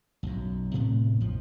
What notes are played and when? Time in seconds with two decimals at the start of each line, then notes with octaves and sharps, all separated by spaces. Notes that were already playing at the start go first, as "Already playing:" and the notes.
0.23 B1 F#2
0.74 A2 C3 A3 B3
1.21 A#1 F2 F3